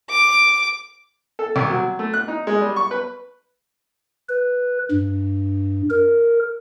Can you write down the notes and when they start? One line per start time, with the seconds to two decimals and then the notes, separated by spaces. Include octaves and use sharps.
0.10 D6
1.39 A4
1.56 C2
1.70 F#3
1.99 A3
2.14 F#6
2.28 D#4
2.47 G#3
2.61 G3
2.76 C#6
2.91 B4
4.29 B4
4.91 G2
5.90 A#4